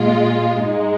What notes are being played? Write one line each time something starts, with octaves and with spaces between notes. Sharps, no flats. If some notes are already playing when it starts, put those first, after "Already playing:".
Already playing: A#2 G#3 F4
G#2 G#3 D#4